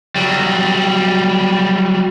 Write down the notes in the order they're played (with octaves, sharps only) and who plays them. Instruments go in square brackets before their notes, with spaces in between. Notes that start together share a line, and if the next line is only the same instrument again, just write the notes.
[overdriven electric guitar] F#3 G3